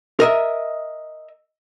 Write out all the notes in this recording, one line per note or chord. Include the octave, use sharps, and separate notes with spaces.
A#4 D#5 E5